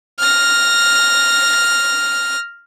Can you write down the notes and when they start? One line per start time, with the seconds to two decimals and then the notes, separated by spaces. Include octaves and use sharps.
0.20 F6 A#6